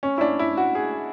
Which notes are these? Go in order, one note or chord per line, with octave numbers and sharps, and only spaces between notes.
C#4
E4
D4
E4
F#4
G#4